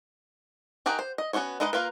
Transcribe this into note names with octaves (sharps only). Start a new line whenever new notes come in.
D#3 G4 G#4 F#5 A#5
C5
D#5
B3 C#4 F#4 C5 C#5
G#3 D#4 B4 D#5 F#5
A#3 F4 A#4 B4